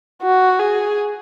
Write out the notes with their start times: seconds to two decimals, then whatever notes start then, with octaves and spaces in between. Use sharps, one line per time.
0.23 F#4
0.60 G#4